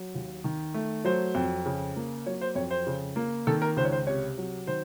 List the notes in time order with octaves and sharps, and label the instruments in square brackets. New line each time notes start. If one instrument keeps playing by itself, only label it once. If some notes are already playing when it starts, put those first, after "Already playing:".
Already playing: [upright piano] F#3
D#2
D#3
A3
F#3 C5
F2
C#3
A#3
F#3 C#5
C5
F2 C#5
C5
C#3
A#3
D#3 A4
A#4
C#2 C5
C#5
C5
C3 C#5
F#3
D#3 C5